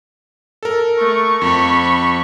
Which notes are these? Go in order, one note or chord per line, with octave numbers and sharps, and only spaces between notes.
A4 A#4
A3 C#6
F2 B5 C#6